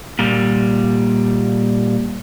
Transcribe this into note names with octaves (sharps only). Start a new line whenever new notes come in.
A#2 G3